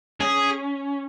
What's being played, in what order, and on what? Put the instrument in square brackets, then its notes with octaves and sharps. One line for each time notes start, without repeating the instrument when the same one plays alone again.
[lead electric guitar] C#4 [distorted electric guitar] G#4